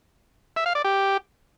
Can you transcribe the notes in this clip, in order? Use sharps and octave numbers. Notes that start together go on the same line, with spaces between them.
E5
F5
D5
G4